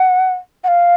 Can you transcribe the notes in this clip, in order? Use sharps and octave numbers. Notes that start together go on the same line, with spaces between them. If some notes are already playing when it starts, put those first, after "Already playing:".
Already playing: F#5
F#5
F5